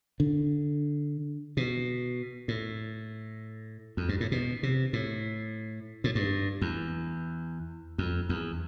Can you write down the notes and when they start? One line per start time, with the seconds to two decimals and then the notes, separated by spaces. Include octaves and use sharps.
0.20 D3
1.57 B2
2.48 A2
3.97 F2
4.09 G2
4.20 A2
4.32 B2
4.63 C3
4.93 A2
6.04 A2
6.15 G2
6.61 E2
7.98 F2
8.29 E2